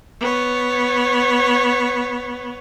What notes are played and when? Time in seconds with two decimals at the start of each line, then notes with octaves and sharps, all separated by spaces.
0.21 B3 C#5